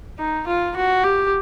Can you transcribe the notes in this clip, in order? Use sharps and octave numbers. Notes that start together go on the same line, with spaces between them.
D#4
F4
F#4
G4